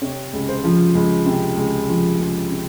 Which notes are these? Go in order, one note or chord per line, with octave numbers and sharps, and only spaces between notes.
C3 C#5
C#2
C5
F3
C#2
C3
C#2
F3
C#2
C3